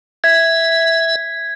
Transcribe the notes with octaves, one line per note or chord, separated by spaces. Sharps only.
E5 G#6 B6